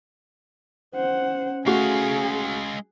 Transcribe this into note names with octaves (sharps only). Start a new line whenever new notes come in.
C#4 C5 F#5
G#3 A3 F#4 G#4 F5